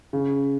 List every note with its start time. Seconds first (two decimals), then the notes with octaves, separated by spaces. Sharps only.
0.13 C#3